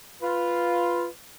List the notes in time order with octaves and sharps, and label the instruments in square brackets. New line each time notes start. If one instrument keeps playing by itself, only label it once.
[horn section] F4 [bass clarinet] B4